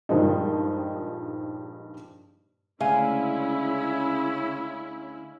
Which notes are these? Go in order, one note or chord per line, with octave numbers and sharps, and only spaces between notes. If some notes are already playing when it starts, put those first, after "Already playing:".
G2 A#2 D#3 F3 G#3 D#4
D2 C#3 G#3 C#4 E4 E5 F5 G#5